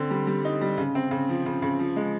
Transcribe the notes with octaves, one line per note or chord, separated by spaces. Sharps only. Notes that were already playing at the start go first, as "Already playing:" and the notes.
Already playing: D3 C4
G3
G3
D#4
G3
C#3
C4
C#3
F3
C#3
C#3
F3
G#3